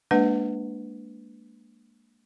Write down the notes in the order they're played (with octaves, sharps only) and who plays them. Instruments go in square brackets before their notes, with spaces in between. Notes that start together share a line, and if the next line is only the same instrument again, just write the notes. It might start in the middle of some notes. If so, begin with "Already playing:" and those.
[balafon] G#3 A#3 D4 B4 F#5